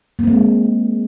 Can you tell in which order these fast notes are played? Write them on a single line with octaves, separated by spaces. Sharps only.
A#3 C4 G#3